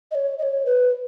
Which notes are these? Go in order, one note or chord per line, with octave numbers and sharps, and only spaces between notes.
D#5
C#5
D#5
C#5
B4